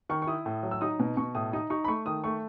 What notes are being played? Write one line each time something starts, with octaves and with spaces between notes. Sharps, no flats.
D#3 C#6
C#6
E4 D#6
A2
F#3
E6
D#4 D#6
B2
B2 C#6
A2 D#6
D#4 D#6
D#4 C#6
B5
A3 C#6
D#3 D#6
A3 C#6